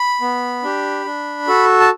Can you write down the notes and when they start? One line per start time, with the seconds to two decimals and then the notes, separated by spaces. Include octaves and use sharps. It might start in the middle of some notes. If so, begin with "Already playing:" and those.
Already playing: B5
0.21 B3
0.63 D4 G4
1.05 D4
1.47 F#4 A4
1.80 A5